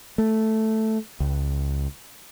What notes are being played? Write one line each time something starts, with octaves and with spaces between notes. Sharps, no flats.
A3
C#2